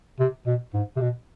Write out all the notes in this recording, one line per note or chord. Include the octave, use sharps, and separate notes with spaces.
C3
B2
G#2
C3
B2